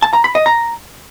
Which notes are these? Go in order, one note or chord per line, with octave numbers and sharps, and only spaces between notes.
A5
A#5
B5
D#5
A#5